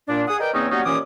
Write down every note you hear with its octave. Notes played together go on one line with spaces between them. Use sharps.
A#2 D4
G#4 F#5 D#6
A#4 B4 D5 D#5 G5
E2 C#3 A#3 C4 C#4 D#4
F#3 G3 A#3 B3 C#4 D#4
D#2 A#2 E3 C#4 D6 D#6